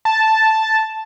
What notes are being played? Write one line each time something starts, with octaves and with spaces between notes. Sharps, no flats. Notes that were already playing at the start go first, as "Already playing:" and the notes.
A5